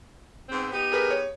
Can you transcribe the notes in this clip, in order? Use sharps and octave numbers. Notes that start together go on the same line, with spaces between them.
G#2 B3 C4
B3 D#4 G4
G#4 A#4 B4
C#5